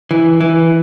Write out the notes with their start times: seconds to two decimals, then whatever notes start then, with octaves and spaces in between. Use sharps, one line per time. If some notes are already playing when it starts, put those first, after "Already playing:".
0.11 E3
0.41 E3